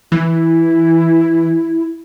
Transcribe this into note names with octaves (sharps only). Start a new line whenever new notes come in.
E3 E4